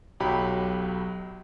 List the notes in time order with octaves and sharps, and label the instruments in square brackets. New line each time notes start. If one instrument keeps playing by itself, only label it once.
[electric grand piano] B1 F#3 G4 B5